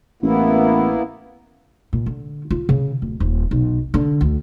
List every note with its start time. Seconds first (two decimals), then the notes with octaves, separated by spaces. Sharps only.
0.23 A1 A#3 B3 E4
1.93 A#2
2.06 D3
2.50 F4
2.69 C#3
3.02 D1
3.20 D#1
3.51 B1
3.94 D3
4.21 D2